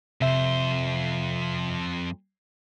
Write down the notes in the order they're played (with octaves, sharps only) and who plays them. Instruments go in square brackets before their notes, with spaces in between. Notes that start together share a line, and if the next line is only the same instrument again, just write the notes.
[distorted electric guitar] F2 C5 [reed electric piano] C3 E5